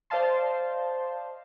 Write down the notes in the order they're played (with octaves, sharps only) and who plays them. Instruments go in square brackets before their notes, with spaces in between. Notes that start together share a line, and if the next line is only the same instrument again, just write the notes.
[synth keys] C5 D5 D#5 F5 A5 C6